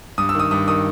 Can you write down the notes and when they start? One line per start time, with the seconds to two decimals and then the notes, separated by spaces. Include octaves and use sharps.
0.18 G2 D#6
0.29 E6
0.34 D#3
0.40 D#6
0.51 G2 D#6
0.68 D#3 D#6